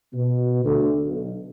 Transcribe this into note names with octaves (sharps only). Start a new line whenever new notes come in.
B2
D2
B1